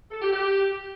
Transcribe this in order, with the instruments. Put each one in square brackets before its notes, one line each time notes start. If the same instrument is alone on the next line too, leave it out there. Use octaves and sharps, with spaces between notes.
[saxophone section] A4
G4
G4